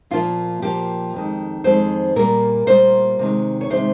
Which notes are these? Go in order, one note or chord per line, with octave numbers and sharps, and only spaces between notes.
A#2 F3 A#3 F4
A#2 F3 A#3 G4
F2 D#3 G#3
F2 D#3 G#3 C5
A#2 G3 A#3 A#4
A#2 G3 A#3 C5
C3 D#3 G#3
C#5
C3 D#3 G#3 C5